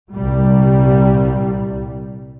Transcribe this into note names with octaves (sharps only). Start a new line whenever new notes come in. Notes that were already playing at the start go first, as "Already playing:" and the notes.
C2 A#2 G3